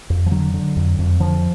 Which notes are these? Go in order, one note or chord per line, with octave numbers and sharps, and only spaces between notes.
F2
F3
D3 F#3
D3
F2
F2
D3 F3